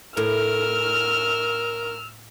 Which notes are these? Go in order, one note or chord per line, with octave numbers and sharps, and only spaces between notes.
A2 A#4 E6 F6